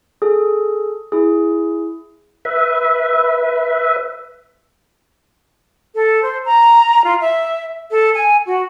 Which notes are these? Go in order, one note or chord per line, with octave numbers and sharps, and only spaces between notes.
G#4 A4
E4 G#4
B4 E5
A4
C5
A#5
F4
E5
A4
G#5
F#4